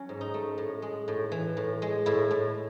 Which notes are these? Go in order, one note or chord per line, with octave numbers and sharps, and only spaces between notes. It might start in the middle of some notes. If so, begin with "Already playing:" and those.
Already playing: F#3 C#4
G#2
D#4
A3
A2
G#3
A2
E3
A2
G#3
A2 E4
A2